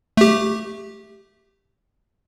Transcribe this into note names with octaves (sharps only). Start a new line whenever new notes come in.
A3 G4